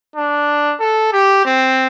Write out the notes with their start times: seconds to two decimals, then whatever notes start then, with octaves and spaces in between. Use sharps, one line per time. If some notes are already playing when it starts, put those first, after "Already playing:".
0.16 D4
0.80 A4
1.13 G4
1.45 C4